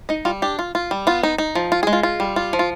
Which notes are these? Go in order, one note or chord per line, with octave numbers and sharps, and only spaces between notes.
D#4 D#5
G3 F4
D4 G4
F4
F4
G3
B3 F4
D#4
D#4
F3
F4
G#4
G#3
F4
F4
G3
F4
F3
F4